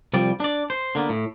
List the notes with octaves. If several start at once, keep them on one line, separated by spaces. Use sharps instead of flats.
C2 F3 G3 D5
D4 D5
C5
D3 A#3 B3
A2